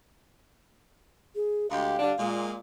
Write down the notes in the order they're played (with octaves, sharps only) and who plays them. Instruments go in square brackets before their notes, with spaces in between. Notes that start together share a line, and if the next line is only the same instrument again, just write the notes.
[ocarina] G#4
[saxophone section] D2 G#3 G4 [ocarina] F5
[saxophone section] D3 G3 D4
A#2 G#3